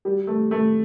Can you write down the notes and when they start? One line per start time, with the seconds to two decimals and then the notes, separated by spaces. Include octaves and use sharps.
0.05 G3
0.27 A3
0.51 A3